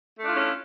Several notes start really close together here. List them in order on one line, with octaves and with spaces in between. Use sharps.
A3 D4 F4 E4 C#4